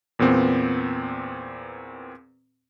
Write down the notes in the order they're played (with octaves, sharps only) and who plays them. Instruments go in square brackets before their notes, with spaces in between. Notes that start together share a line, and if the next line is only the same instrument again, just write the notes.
[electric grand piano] E2 A#2 B3 C4